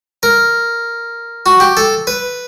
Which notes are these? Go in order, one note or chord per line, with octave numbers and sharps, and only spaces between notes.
A#4
F#4
G4
A4
B4